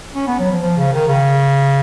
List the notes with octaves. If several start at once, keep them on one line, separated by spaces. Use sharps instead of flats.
C#4
B3
F#3
F3
F3
C#3
D#3
C#3